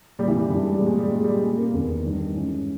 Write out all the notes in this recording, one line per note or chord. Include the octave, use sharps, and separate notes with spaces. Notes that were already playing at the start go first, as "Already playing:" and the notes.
A#2 G3
E3
G3
G2 E3 G3
G#3
G3
A#2
G#3
G3
A#2 G#3
G3
A#2 G#3
A#3
E2 D#3 B3
G2 D#3
G#2 E3 C#4